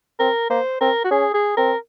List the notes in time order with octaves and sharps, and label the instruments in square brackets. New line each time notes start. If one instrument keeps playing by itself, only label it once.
[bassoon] C4 [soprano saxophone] A#4
[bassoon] A#3 [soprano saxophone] C5
[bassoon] C4 [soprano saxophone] A#4
[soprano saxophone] F#4
[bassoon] C#4 [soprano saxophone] G#4
[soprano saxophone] G#4
[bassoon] C4 [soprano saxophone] A#4